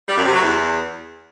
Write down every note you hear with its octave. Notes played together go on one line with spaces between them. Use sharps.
G3
F#2
C3
F#3
E2